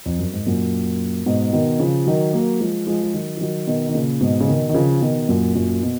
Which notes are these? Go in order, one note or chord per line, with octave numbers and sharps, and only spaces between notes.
F2
F#2
G#2
F#2 A#2
G#2 B2
B2 D#3
C#3 F3
D#3 F#3
F#3 A#3
F3 G#3
F3 G#3
G#3
D#3 F#3
F3
D#3 F#3
B2 D#3
D#3
A#2 C#3
G#2 B2
C#3
B2 D#3
D#3
C#3 F3
B2 D#3
F#2 A#2
F#2 A#2
B2